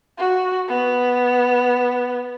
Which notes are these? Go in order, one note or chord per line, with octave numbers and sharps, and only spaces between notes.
F#4
B3